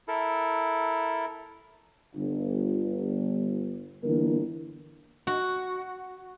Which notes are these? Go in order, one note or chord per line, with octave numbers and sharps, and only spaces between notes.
E4 A4 A#4
G1
G1 D3 E3 A#3 A#4
F#4